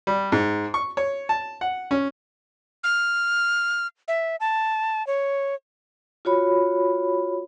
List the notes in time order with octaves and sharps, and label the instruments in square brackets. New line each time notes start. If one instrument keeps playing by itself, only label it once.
[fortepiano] G3
G#2
C#6
C#5
A5
F#5
C#4
[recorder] F6
E5
A5
C#5
[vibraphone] F4 F#4 C#5 B5